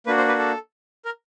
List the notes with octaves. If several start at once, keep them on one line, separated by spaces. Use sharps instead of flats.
A#3 D4 F#4 B4
C5
B4
A4
A#4